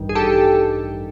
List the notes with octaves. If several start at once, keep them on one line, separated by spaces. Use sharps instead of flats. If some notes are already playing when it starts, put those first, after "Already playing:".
Already playing: A1 G2 D#3
G#4
G4 A4